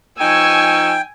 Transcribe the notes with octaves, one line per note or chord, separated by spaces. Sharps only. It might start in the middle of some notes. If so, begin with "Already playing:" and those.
F3 D#4 G5 G#5 C#6 E6